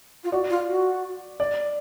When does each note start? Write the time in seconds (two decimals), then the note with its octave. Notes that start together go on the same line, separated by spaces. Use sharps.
0.24 F4
0.32 F#4 D5
0.50 F4
0.68 F#4
1.40 D5